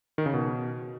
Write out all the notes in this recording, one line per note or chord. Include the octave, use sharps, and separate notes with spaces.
D#3
C#3
B2